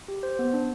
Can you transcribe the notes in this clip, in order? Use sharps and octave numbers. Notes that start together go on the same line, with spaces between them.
G4
C5
B3
D4